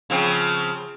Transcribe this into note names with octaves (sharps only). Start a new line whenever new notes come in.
C#3 F3 C4